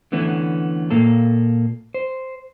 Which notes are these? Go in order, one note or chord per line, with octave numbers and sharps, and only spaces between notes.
D3 E3 A3 B3 C#4
A#2 A#3 A4
C5